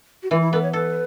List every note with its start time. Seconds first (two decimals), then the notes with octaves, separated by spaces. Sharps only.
0.23 F#4
0.31 E3 E4
0.41 E4
0.53 B3 A4
0.63 C#5
0.73 A4 B4